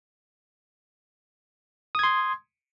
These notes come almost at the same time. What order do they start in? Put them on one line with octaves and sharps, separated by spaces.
D#6 G#6 C6